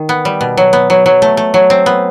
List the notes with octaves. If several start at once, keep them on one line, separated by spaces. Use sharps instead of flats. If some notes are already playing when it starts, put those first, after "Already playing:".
Already playing: D#3
B3
G3
B2
F#3
B3
F#3
F#3
A3
A3
F#3
C4
B3